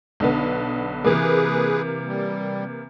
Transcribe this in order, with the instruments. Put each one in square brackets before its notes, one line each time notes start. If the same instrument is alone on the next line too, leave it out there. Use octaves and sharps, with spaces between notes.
[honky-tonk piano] B1 D3 B3
[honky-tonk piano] C3 E3 A#3 [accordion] G#4 B4
[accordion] G3